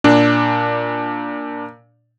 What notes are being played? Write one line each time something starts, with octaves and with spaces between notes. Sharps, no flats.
A#2 D4